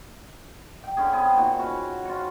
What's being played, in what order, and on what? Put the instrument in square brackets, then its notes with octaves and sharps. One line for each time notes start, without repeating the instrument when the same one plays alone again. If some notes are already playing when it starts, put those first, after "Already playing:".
[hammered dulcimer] G5
D3 C#4 G#4
B3 C4 G#4 G5
A#2 D#3 F#4
C#4 F#4 B4
F4 F#4 C#6